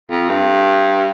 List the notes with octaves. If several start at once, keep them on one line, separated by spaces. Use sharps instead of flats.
F2
G2